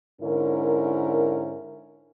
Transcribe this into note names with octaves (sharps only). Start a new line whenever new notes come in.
G#2 D3 C#4 E4 A#4